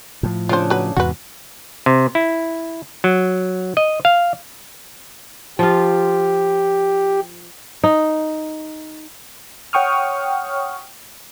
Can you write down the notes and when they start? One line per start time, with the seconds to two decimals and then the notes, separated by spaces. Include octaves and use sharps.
0.23 A2 F3
0.49 C#3 D4 F4 C5
0.70 F#3 B4
0.97 E2 G#2 C3 F#4 B4
1.86 C3
2.15 E4
3.04 F#3
3.77 D#5
4.05 F5
5.59 F3 F4 G4
7.84 D#4
9.73 C#5 F#5 G5 C#6 D#6 F6